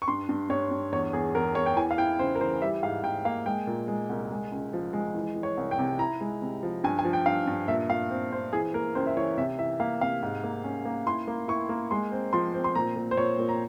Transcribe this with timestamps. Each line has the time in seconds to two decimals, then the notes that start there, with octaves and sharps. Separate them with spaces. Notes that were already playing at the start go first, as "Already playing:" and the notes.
0.02 C#6
0.08 G2 C6
0.29 G2
0.50 G2 C#5
0.71 G2
0.92 E2 C#5
1.13 E2 G#4
1.35 E2 A#4
1.55 E2 C#5
1.66 G5
1.76 E3 G#5
1.91 F5
1.98 E4 G5
2.19 C#3 C5
2.35 A#4
2.40 E3 C5
2.61 G3 E5
2.82 G#2 F5
3.03 G#2 G5
3.25 A#3 F5
3.46 G#3 G5
3.67 A#2
3.88 G#3
4.10 C2
4.31 G#3
4.51 C#2
4.73 F3
4.93 G#3
5.15 E3
5.36 E3
5.43 C#5
5.57 C2
5.71 G5
5.79 C3
5.99 E4 A#5
6.21 G#3
6.42 C3
6.63 F3
6.84 G2 G#5
6.99 G#5
7.05 F3
7.13 G5
7.26 G2 F5
7.47 G2
7.68 A#2 E5
7.90 A#2 F5
8.10 C4
8.32 C4 C5
8.53 E3 G#4
8.74 A#3 A#4
8.95 C#2 C5
9.07 E5
9.17 E3 C#5
9.38 C3 E5
9.59 E3 E5
9.80 A#3 F5
10.01 C3 F5
10.23 G#2
10.44 A#3
10.64 C#4
10.85 A#3
11.06 E4 C6
11.27 A#3
11.48 E4 C#6
11.69 A#3
11.91 G#3 C6
12.12 C4
12.33 F3 C6
12.54 C4
12.64 C6
12.75 A#2 A#5
12.96 A#2
13.11 C5
13.17 A#2 C#5
13.39 A#2
13.49 A#5